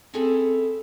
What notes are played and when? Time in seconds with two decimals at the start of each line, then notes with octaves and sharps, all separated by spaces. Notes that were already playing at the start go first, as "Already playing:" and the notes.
0.14 C4 C#4 E4 G#4 A4 C#5